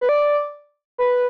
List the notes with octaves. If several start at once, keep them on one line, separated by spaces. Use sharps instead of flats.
B4
D5
B4